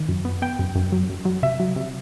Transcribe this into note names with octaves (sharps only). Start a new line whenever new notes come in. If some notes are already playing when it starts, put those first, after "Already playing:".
Already playing: D#3
F#2
B3
B3 G5
F#2
F#2
F#3
F#2
F#3
C3 E5
F#3
C3